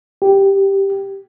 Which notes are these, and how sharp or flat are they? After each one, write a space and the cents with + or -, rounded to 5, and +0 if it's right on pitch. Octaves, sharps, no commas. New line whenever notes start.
G4 +0